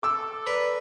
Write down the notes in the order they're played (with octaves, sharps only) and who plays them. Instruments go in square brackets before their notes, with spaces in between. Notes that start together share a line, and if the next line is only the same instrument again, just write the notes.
[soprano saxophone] A4 [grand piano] D6 E6
[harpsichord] A#4 B4 [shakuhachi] D5